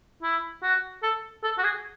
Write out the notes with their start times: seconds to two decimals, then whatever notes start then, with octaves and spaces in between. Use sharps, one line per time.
0.23 E4
0.62 F#4
1.03 A4
1.43 A4
1.58 F#4
1.64 G#4